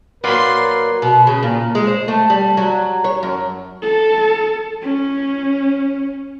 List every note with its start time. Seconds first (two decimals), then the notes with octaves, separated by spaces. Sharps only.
0.24 A#2 F#3 A#4 B4 D5 F5 C6
1.02 B2
1.27 C#3
1.43 A#2
1.75 G#3
1.87 C5
2.08 A3
2.30 G3
2.57 F#3
3.04 C#5
3.23 F#2
3.82 A4
4.83 C#4